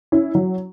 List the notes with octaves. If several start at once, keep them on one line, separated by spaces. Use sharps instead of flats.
C#4 E4
F#3